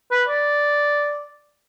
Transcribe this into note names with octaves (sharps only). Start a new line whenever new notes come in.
B4
D5